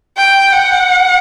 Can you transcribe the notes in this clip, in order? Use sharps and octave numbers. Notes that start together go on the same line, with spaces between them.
G5
F#5